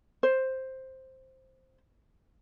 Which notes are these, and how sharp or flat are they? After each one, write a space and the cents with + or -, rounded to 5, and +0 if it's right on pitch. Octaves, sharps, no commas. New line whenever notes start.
C5 +5